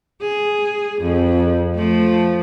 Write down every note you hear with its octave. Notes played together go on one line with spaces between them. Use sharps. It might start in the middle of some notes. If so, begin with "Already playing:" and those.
G#4
F2
F3 A3